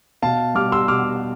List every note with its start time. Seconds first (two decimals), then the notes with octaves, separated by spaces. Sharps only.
0.22 B2 F5 A5
0.55 G3 D6 F6
0.72 C6 E6
0.88 B2 D6 F6